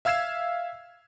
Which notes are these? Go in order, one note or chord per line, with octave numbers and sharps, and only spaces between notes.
E5 F5 E6 G#6 C7 E7